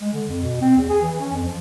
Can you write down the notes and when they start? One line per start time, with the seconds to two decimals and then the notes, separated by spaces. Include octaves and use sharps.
0.01 G#3
0.13 D3
0.29 F2
0.43 B2
0.61 C4
0.77 E2
0.89 G#4
1.02 E3
1.21 C#4
1.32 F2
1.44 F3